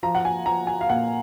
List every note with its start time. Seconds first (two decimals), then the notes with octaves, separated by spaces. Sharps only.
0.03 F3 A#5
0.15 F#5
0.25 G#5
0.46 F3 A#5
0.67 G#5
0.81 F5
0.89 A#2 F#5